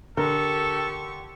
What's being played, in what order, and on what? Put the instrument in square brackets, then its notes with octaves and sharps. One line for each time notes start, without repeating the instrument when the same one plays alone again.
[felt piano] D3 [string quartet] G4 C#6 [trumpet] A4 [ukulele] A#4